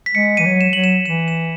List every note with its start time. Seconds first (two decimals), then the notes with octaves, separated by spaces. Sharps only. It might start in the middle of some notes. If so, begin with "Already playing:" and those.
0.06 B6
0.15 G#3 C#7
0.37 E3 D#7
0.46 F#3
0.61 E7
0.73 F#3 F#7
0.84 E7
1.05 E3 E7
1.28 E7